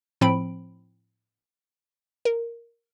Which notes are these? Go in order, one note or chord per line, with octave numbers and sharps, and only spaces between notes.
A2 F3 C4 B5 D7
A#4